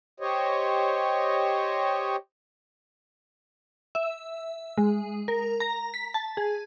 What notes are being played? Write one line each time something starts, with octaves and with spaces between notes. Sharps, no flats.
G4 C5 C#5 D#5
E5
G#3
A#4
A#5
B6
A5
G#4